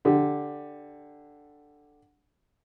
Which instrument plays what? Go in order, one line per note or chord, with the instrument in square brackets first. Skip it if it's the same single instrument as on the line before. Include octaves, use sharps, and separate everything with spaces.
[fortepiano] D3 G4